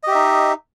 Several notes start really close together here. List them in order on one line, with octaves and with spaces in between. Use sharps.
D#5 G4 E5 D#4